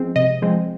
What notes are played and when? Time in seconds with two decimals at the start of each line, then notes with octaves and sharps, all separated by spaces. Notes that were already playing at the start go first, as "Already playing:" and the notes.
Already playing: F3 G#3 C4
0.16 C3 D#5
0.42 F3 G#3 C4